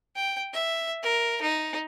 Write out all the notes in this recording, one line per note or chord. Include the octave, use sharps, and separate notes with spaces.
G5
E5
A#4
D#4